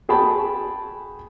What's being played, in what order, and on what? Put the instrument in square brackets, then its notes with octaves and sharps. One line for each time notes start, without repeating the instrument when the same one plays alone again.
[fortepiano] F#4 G#4 G5 A5 B5